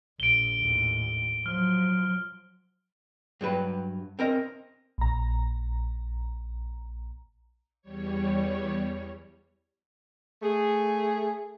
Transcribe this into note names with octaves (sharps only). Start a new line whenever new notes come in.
A#1 D7 G7
D#2 A2
F3 F#3 F6
G2 F#3 B4 G5
C4 A#4 D#5
A#1 A#5
E2 G3 C#5
A3 G#4